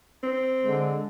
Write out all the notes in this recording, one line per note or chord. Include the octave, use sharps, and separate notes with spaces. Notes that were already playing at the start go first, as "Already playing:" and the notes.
C4
D3 G#3